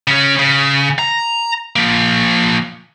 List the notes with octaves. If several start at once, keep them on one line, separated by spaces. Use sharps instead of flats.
C#3 C#4
C#3
A#5
F3 A#3